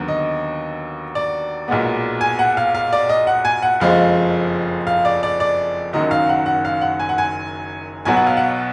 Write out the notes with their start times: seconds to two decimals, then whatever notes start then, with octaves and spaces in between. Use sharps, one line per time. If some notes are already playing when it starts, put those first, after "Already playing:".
Already playing: D#2 D3 F#3 B3
0.08 D#5
1.15 D5
1.68 B1 A#2 G#3 B3
2.21 G#5
2.39 F#5
2.57 F5
2.75 F5
2.93 D5
3.09 D#5
3.27 F#5
3.45 G#5
3.62 F#5
3.80 F#1 F2 F3 G#3 F5
4.87 F5
5.05 D5
5.23 D5
5.40 D5
5.93 F#1 F#2 D#3 F#3 D#5
6.11 F5
6.29 F#5
6.46 F#5
6.65 F5
6.81 F#5
7.00 G#5
7.09 F#5
7.18 G#5
8.05 B1 B2 F#3 B3 G#5
8.16 F#5
8.27 F5
8.37 F#5